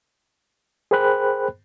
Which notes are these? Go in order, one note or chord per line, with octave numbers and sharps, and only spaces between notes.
G#4 A#4 C5 G5 B5 F#6